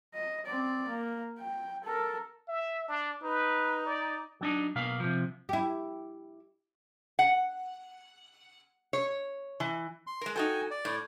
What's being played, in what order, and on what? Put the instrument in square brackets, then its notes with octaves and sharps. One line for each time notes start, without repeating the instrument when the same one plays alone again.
[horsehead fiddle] D#5
C4 D5
A#3
G5
A4 A#4
[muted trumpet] E5
D4
[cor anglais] D#4 [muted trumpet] B4
[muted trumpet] D5
[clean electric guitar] F#3 D4 D#4
B1 B2 A#3 F5
C3 F3
[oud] E4 G4
[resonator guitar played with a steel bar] F#5
C#5
E3
[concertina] C6
[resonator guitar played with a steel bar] G#3 A#4
[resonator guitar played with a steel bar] D#4 F#4 A4 [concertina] G5 G#5
[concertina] D5
[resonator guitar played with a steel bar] A2